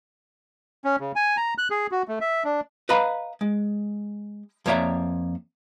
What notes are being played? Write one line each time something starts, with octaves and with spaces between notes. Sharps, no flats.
C#4
C#3
G#5
A#5
F#6
G#4
F#4
A3
E5
D4
B4 D#5 F5 A#5 B5
G#3
F2 A#3 C#5 D5 E5 A#5